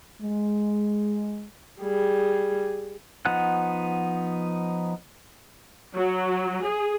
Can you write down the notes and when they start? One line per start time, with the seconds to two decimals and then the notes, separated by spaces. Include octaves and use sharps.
0.22 G#3
1.82 G3 G#4
3.25 F3 B3 D#4 F#5 F#6
5.95 F#3
6.63 G#4